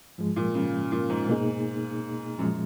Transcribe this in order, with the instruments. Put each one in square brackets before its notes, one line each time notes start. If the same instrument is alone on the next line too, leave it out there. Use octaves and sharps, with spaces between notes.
[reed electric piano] G#2 F3 G#3
[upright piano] A#2
C#3
A#2
G#2
[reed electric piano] B2 A#3 D#4 G#4
[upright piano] F#2 [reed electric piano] A#2 F3 G#3